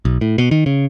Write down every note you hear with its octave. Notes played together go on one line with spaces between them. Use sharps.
B1
A2
B2
D#3
C#3